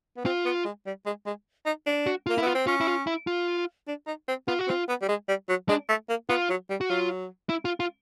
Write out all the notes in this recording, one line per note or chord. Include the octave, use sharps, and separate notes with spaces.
B3
C4 F4
B3
G#3
G3
G#3
G#3
D#4
D4
F#4
F4
A#3
E4
B3 F4
C4
C#4 F4
E4
F4
E4
F4
D4
D#4
C4
B3 F4
F#4
C4
F4
B3
G3
G#3
G3
F#3
G#3 D4
A3
A#3
B3 F4
F#3
G3
F#4
F#3 F4
E4
F4
F4